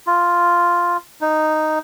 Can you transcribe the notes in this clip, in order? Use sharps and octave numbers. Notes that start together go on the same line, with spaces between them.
F4
D#4